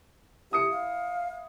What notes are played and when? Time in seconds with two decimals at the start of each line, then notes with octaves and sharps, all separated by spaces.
0.51 E4 G4 D#6 C#7
0.71 F5